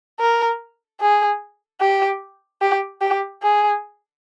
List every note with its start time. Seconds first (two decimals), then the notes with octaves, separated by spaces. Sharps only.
0.20 A#4
1.01 G#4
1.81 G4
2.62 G4
3.01 G4
3.42 G#4